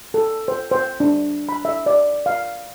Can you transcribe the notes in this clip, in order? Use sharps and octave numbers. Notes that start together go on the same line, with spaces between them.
A4
C5
C5
D4
B5
E5
D5
F5